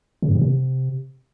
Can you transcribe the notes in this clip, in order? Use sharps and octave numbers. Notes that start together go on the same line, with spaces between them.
C#3
G2
B2
C3